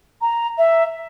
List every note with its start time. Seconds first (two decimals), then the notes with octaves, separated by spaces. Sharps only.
0.21 A#5
0.58 E5